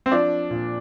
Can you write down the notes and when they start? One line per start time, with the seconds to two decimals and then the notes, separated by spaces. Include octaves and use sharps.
0.06 C4
0.12 F3 D4
0.50 A#2